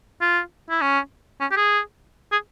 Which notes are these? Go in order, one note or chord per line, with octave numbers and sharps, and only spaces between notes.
F4
E4
C#4
C#4
G4
G#4
G#4